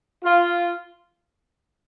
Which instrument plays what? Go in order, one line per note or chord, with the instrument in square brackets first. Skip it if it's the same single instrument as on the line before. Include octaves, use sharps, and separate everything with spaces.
[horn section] F4